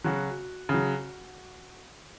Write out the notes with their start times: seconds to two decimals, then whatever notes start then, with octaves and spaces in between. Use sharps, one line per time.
0.04 C#3 F#3 F#4
0.69 C#3
0.74 F#3